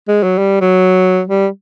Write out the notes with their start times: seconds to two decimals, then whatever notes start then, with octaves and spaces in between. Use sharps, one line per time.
0.08 G#3
0.23 F#3
0.38 G3
0.61 F#3
1.27 G3